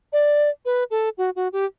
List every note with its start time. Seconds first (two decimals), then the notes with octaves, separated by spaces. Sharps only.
0.13 D5
0.65 B4
0.91 A4
1.18 F#4
1.36 F#4
1.53 G4